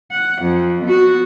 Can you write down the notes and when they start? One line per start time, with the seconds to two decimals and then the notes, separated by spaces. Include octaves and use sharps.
0.12 F#5
0.42 F2
0.85 B3 F#4